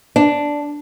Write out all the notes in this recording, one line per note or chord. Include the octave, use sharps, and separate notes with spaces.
D4